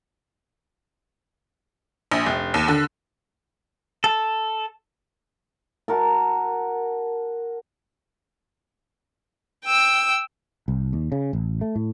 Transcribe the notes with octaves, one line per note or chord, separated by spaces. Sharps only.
A#1
F1
D#2
D3
A4
F#4 A#4 A5
G5 E6
C2
D#2
C#3
A1
A3
A2